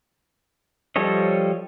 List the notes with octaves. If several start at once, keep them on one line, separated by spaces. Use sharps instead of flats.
F3 G3 A4 C#5 D#5